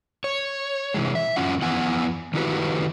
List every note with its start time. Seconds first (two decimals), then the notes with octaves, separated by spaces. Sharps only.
0.24 C#5
0.94 C3 E3 G#3
1.15 E5
1.36 F#2 E3 C#4 F4 F#5
1.62 F2 E3 B3 F#5 G#5
2.34 D#3 A3 E4 F#4 G4 B4